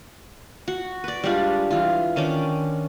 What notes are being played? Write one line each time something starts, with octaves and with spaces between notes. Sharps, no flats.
F#4
B4 D5
G3 G#3 D4 F4
E3 F4
D#3 C#4 D4 D6